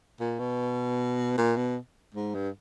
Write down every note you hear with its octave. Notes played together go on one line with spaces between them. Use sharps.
A#2
B2
A#2
B2
G#2
G2